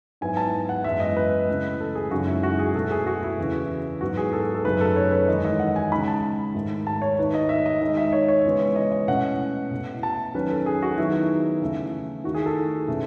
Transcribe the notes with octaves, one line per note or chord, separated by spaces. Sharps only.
G#2 F#3 B3 E4 G#5
A5
F#5
F#2 E3 G#3 B3 E5
D#5
B4
C#3 E3 A3
A4
G#4
F#2 C#3 G#3 D#4 F#4
E4
F#4
G#4
B2 A3 E4 A4
G#4
F#4
E4
E2 C#3 E3
G#2 F#3 B3 E4 F#4
G#4
A4
A4
F#2 C#3 F#3 A3 D#4 B4
A4
C#5
B4
E2 D#3 G#3 D#4 D#5
D#5
F#5
G#5
C#3 G#3 D#4 B5
A5
G#2 D#3 A3
A5
C#5
D#3 A3 D#4 B4
D#5
E5
D#5
D#3 G#3 D#4 D#5
E5
C#5
C#5
C#3 E3 G#3 B3 E4
D#5
D#5
B2 A3 C#4 E4 F#5
B2 A3 E4
A5
D#3 F#3 C#4 B4
A4
G#4
F#4
D#3 F#3 B3 D#4 E4
C#3 E3 A3 E4
D#3 A3 E4 F#4
G#4
A4
B2 A3 C#4 E4